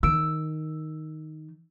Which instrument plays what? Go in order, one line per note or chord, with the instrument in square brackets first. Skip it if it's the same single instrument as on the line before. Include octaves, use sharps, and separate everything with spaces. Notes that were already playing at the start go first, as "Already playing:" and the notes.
[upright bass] D#3 [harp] E6 D7